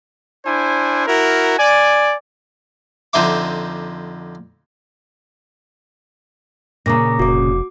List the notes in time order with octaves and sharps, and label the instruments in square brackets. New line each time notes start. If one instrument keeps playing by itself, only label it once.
[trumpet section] D4 E4 C5 G#5
E4 F#4 A#4
D5 G#5
[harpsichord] F2 D3 D#4 C5 E5 D6
[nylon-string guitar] A#2 C#3 [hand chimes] A#5 D6 A#6
[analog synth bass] F1 [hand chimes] F#4 D6